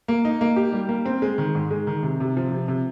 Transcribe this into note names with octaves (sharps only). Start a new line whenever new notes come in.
A#3
D#4
A#3
G4
G3
A#3
C4
G#3
D#3
G#2
G#3
D#3
C3
C3
F3
C3
C3